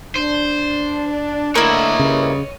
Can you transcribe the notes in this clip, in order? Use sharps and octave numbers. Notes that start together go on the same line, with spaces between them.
D4 C5
D3 A3 A#3 E4 C#5 D#5
G2 C#3